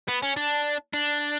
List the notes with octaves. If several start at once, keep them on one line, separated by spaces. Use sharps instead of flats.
B3
C#4
D4
D4